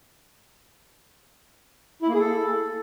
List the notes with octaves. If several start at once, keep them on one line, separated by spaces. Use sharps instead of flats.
E4
A#3
G#4
A4